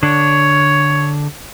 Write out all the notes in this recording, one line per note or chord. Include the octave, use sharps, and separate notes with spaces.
D3 D4 C#5